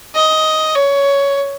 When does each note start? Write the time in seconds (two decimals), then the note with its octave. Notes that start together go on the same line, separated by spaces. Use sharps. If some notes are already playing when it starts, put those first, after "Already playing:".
0.15 D#5
0.76 C#5